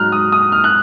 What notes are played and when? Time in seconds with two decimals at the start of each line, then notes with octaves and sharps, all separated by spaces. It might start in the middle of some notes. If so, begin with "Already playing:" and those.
Already playing: G#2 F#3 A#5 F6 F#6
0.12 D#6
0.32 D#6
0.52 F6
0.64 F#6